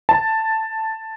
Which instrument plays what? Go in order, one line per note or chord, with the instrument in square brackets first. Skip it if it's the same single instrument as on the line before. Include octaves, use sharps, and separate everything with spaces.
[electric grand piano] A5